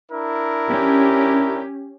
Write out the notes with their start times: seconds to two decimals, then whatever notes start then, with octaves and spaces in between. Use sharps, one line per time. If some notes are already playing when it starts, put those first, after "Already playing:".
0.12 D4 E4 A#4
0.70 C#4 G4